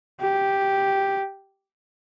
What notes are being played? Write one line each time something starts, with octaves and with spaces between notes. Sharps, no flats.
G4